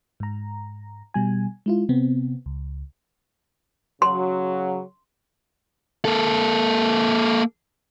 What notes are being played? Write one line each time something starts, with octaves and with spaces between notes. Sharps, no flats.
G#2 A#5
B2 G3 G#5
G#3 E4 F4
C3 B3 C4
C#2
C#3 F#3 C6
A#3 A4